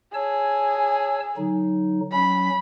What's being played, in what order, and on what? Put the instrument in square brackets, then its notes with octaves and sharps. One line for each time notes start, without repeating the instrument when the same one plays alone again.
[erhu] G#4 [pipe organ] C#5 A5 E6
[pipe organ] D3 F#3 D#4
[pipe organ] F#3 C#4 [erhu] B5